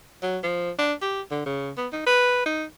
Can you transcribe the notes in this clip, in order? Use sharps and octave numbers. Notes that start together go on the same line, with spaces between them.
F#3
F3
D4
G4
D3
C#3
B3
D#4
B4
D#4